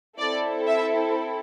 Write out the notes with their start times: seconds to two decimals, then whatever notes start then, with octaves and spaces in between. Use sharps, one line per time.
0.19 C4 E4 A4 D5
0.67 E5